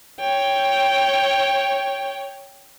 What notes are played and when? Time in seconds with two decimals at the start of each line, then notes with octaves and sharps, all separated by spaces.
0.20 C#5 G5